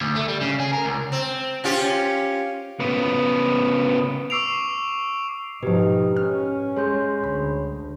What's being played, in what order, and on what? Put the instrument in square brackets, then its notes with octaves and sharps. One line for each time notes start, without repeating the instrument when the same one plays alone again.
[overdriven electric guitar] D2
A3
G3
C#3
G#4
A#4
C#2
[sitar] C4
C#4 F4 G4
[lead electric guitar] C#3 B3
[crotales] C#6 D6 E6 C7 D7 F7
[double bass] G#2 D#4 [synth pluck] B2 F3 [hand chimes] G4 B4
[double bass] C#4 [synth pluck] F6
[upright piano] G#3 [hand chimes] C#5 C6 G6
[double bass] D2 [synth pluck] B5